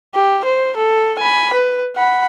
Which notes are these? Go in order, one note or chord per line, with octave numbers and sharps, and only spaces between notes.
G4
C5
A4
G#5 B5
B4
F#5 B5